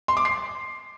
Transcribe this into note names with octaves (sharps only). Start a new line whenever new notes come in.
C6
D6
C7